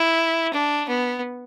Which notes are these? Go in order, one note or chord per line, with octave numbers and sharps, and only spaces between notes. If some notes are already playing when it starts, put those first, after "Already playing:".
Already playing: E4
D4
B3